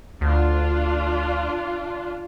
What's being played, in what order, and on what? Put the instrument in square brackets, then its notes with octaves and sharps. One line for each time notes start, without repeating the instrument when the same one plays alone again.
[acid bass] D2 [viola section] D4 F4